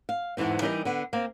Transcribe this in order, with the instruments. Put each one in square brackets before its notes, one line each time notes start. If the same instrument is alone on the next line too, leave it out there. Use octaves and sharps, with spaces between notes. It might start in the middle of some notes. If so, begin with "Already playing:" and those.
[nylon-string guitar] F5
E2 G#2 D3 E3 C4
E3 G3 D#4 G4 A#4 D#5
D3 B3
A#3 C4 F5